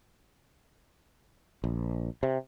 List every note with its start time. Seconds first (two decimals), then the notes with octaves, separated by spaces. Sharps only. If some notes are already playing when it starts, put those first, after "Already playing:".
1.64 A#1
2.23 C3